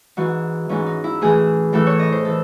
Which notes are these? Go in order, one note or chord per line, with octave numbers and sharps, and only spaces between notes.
G#2 E3 F#4
G#2 E3 C#4
D#4
E4
A2 E3 G#4
A2 E3 A4
C#5
D#5
C5
E3 A4